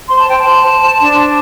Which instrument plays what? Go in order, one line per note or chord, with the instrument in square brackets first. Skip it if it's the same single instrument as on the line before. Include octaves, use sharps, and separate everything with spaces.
[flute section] C5 C6
A5
C5 G5
A5
C5
C5
C5
D4
C5